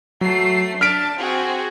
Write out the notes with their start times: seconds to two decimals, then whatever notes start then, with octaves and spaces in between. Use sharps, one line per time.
0.21 F#3 A3 C7
0.81 D4 A5 F6 B6 D7
1.19 C4 F#4 G#4